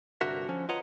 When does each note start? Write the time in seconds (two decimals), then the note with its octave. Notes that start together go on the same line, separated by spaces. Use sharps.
0.21 C2 G2 D3 F#4 A#4 E5
0.49 D3 F3 C#4
0.69 F4 B4 C#5 D#5 F#5 A#5